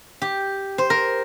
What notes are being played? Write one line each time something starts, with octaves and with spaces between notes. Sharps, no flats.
G4
C5
A#4